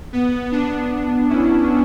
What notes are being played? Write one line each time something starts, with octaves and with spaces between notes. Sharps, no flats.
B3
B3 D4
C#4 E4